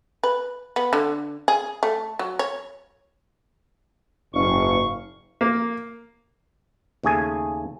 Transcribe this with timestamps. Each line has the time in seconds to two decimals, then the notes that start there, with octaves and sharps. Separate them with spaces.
0.23 B4
0.76 B3
0.93 D3
1.48 G#4
1.83 A3
2.19 F#3
2.39 C#5
4.34 F#1 G#2 F5 C#6
5.41 A#3
7.03 D#2 C#3 A3 G#4 G#5